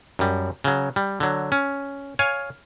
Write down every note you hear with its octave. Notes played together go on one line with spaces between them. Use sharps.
F#2 G3
C#3 F#3
G3
D3 F#3
C#4
C#5 F5 G#5